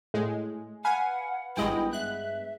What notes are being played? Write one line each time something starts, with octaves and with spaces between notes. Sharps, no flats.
A2 G#3
B4 F5 F#5 G#5
G#1 G2 G#3 B3 E4 D#5 G5
E5 F#6